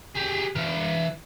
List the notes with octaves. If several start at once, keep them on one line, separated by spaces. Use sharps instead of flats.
G4 G#4
E3 F5